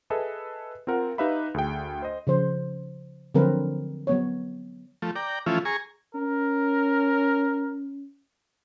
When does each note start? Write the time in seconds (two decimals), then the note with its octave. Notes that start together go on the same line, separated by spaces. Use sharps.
0.10 G#4 A4 B4 D#5 E5
0.87 C4 F4 A#4 F#5
1.18 D#4 G4 B4 E5 F5 B5
1.54 D2 G#4 G5
2.02 C5 D#5
2.27 C#3 F3 C5
3.35 D3 F3 F#3 C4 A#4 B4
4.07 F#3 B3 C#5
5.02 F3 A3
5.16 D5 G5 A#5
5.46 E3 F3 A3 C#4 E4 F4
5.65 G#4 G#5 A#5 C#6
6.15 C#4 A#4